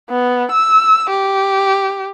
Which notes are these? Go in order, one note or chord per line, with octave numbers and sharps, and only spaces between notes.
B3
E6
G4